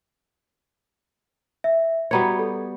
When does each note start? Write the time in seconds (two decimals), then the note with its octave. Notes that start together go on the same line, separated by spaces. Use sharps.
1.64 E5
2.11 G3 B3 F#4 C#5 A#5 G#6
2.39 A4